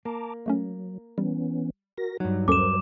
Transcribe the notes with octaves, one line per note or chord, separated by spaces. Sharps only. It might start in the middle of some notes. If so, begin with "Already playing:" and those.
A#3 A5 A#5 D6
F#3 G#3 A3 C#4
E3 G3 B3 C#4
F#4 A#4 A#6
G2 F#3 D#4
D#2 C#4 A4 A#4 C5 D6 E7